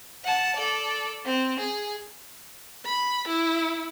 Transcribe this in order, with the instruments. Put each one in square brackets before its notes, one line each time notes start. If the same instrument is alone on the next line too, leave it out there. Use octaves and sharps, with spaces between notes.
[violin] F#5 A5
A4 D5
C4
G#4
[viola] B5
E4